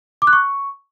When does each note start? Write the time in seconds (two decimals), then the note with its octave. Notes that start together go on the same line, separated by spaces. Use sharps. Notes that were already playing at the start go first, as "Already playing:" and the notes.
0.22 D6
0.27 F#6
0.33 C#6